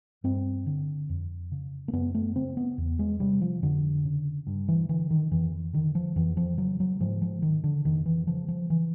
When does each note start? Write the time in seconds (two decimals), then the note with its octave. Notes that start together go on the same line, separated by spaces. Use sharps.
0.24 G2 C4
0.66 D3
1.09 F2
1.52 C#3
1.88 A#3
1.93 F#2 B3
2.15 A3
2.35 C#3 C4
2.57 B3
2.78 E2
2.99 G#3
3.20 C3 G3
3.42 F3
3.63 F2 D3
4.05 C#3
4.47 G2
4.68 E3
4.89 D3 E3
5.11 D#3
5.31 F2 E3
5.73 D3 D#3
5.95 F3
6.16 F2 E3
6.37 F3
6.58 C#3 F#3
6.80 F#3
7.00 G#2 F3
7.22 F3
7.42 D#3
7.64 D3
7.85 F2 D#3
8.06 E3
8.27 C#3 F3
8.48 F3
8.70 E3